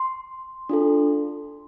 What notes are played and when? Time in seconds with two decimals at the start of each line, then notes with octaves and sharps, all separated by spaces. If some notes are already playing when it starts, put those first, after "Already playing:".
Already playing: C6
0.69 D4 F4 A4